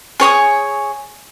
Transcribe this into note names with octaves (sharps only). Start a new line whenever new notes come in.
G#4 C#5 G#5 D#6